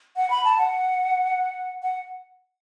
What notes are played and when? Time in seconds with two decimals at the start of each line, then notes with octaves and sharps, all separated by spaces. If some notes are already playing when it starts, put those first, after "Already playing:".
0.16 F#5
0.30 B5
0.45 A5
0.58 F#5
1.82 F#5